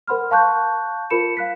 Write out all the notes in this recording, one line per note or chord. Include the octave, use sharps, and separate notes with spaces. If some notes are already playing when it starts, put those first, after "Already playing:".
A#4 C5 F#5 B5 C6 F6
F5 A5 C#6 F#6 G6
F4 A#4 C5 B5 C#7 E7
F5 F#6 B6